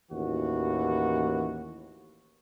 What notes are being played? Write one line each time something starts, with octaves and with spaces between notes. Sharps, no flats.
A1 D#2 E3 F#4